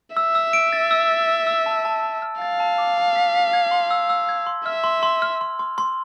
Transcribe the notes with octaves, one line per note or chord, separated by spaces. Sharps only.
E5 E6
E6
D7
A6
E6
A6
E6
E6
A5
A5
A5
F6
F5 A6
A5
D6
A5
B6
B6
G#6
C6
E6
E6
G#6
C6
E5 F6
C6
C6
F6
C6
C6
C6